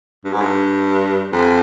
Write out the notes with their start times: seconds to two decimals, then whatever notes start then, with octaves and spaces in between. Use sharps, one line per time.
0.25 G2
0.33 G#2
0.41 G2
1.32 F2